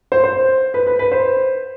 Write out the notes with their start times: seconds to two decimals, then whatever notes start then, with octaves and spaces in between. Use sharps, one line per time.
0.12 C5
0.24 C5
0.74 B4
0.87 B4
0.99 B4
1.12 C5